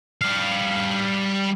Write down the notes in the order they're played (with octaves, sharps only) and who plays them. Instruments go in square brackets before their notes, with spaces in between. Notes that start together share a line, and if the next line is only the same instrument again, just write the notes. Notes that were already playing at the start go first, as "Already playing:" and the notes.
[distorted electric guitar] G3 F5